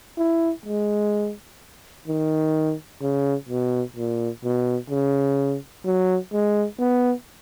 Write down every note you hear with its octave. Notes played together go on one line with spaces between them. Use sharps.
E4
G#3
D#3
C#3
B2
A#2
B2
C#3
F#3
G#3
B3